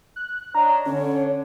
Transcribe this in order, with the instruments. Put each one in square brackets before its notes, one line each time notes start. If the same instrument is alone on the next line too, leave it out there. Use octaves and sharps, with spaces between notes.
[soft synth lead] F#6
[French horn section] D4 C#5 D#5 [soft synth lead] A#5
[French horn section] D3 [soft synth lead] C#4 [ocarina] C#5